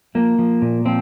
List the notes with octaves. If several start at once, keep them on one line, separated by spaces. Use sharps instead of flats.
F3 A#3
F3
A#2
F3 C4